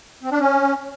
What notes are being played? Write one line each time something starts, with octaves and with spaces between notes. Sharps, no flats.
C4
D4
C#4